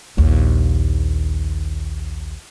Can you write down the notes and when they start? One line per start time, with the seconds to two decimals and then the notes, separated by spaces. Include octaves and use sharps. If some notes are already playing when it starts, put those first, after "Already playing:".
0.17 A#1 D#2